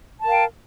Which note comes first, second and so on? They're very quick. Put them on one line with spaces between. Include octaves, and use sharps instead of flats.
A5 A#4 F5 G5